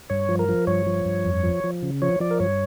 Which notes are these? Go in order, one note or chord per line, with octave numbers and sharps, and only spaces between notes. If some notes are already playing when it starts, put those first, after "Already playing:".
G2 C#5
F3
A#4
F3
G2 C#5
F3
G2
F2
F3
F3
C#3
F3 C#5
F3 D5
A#4
G2 C#5